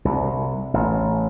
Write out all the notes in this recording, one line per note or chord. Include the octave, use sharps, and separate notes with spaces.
C2
A1